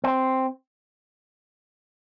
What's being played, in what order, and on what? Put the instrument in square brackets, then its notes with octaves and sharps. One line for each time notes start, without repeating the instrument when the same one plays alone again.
[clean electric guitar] C4